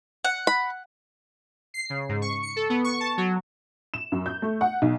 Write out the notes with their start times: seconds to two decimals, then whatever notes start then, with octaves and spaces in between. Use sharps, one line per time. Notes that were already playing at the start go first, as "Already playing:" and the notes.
0.25 F#5
0.47 B5
1.74 C7
1.90 C#3
2.09 G#2
2.22 C#6
2.43 C#7
2.56 A4
2.70 B3
2.84 C#6
3.00 A5
3.17 F#3
3.94 E7
4.12 F#2
4.26 G6
4.42 A3
4.61 F#5
4.82 B1